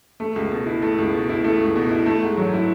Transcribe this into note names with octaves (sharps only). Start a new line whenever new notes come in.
A3
C#2
B2
E4
A3
C#2
B2
E4
A3
C#2
B2
E4
A3
G#2
F#3
E4